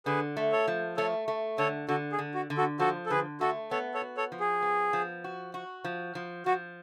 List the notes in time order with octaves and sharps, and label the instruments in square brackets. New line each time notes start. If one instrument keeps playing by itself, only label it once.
[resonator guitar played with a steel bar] D3 [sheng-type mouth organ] G#4 B4
[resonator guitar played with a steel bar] A3
[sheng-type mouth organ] A4 C#5
[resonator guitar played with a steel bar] F3
[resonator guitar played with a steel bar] A3 [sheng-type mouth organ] A4 C#5
[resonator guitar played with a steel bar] A3
[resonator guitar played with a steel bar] D3 [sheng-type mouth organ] A4 C#5
[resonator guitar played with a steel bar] D3 [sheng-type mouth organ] F#4 A4
[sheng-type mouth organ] G#4
[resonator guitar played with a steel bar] D3
[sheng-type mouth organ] F#4
[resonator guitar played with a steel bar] D3
[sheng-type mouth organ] F#4 A4
[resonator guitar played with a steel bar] F3 [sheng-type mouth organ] F#4 A4
[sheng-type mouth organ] A4
[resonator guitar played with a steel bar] D3 [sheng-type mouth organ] G#4 B4
[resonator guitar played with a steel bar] A3 [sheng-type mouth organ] F#4 A4
[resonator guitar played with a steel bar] B3 [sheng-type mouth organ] A4 C#5
[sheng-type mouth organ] A4 C#5
[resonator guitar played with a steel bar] F#4
[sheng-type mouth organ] A4 C#5
[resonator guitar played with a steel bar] F3
[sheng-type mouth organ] G#4
[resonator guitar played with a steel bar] B3
F3
F#4
F#4
F3
F3
[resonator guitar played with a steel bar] F3 [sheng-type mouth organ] F#4